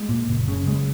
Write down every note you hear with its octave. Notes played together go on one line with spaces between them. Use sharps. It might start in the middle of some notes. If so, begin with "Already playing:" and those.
Already playing: G#3
A#2
F#1
C#3
F#1 G#3